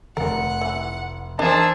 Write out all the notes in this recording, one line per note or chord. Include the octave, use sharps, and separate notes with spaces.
F1 A#4 F#5
E3
E3 D4 D#4 G#4 A#4 C5 A5 E6